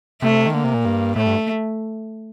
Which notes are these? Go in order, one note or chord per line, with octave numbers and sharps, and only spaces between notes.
C3 A3
D#3
D3 A#3
C3
A#2
G2
A2 A3
G2